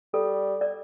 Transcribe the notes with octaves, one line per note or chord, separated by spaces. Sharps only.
G3 A4
D5